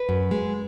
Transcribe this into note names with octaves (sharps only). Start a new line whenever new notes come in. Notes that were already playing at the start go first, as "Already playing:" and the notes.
Already playing: B4
F#2
G#3